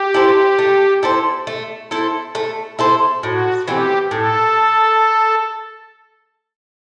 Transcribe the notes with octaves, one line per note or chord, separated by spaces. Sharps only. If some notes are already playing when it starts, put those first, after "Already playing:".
Already playing: G4
E4 A4 C5
A3
E4 A4 C5
A3
E4 A4 C5
A3
E4 A4 C5
A2 F#4
E3 A3 C4 G4
A2 A4